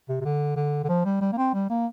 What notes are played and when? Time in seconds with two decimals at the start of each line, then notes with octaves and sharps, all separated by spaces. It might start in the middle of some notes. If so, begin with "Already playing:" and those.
0.09 C3
0.21 C3
0.25 D3
0.56 D3
0.84 D3
0.89 F3
1.05 G3
1.21 G3
1.32 A#3
1.38 C4
1.54 G3
1.70 A#3